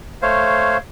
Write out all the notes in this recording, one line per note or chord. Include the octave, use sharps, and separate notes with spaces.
A3 C5 C#5 F5